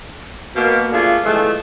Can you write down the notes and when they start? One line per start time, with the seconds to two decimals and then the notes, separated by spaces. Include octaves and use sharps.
0.55 B2 A#3
0.92 A3 A#3 D4 F4 G#4
1.23 A#2 E3 F3 G#3 A3